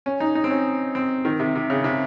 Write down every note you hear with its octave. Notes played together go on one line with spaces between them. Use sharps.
C#4
D#4
D#4
C4
C#4
C4
D#3
C3
C3
C#3
C3